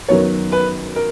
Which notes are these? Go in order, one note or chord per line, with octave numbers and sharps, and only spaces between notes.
F#2 D#3 F#3 B3 C#5
B4
A#4